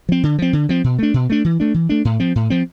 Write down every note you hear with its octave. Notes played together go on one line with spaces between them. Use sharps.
F3 C4
D3
F3 C4
D3
F3 C4
B2
A3 D4
B2
A3 D4
E3
A3 D4
E3
A3 D4
A2
F3 C4
A2
F3 C4